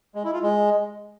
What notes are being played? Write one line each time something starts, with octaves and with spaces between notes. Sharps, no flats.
G#3
E4
F4
G#3